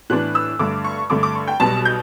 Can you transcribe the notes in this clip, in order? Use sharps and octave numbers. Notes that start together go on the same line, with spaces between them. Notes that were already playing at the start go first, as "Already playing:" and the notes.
A2 E3 B3 D4 F#6
E6
G2 D3 A3 D6
C#6
G2 D3 A3 D6
D6
C#6
G5
B1 B2 G3 B3 A5
G6